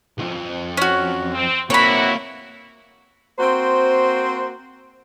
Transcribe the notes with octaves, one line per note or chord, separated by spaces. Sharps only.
C2 F2
C#4 F#4
C4
A#3 C4 E4 F#4 C#5 B5
A#3 C4 F#4 C5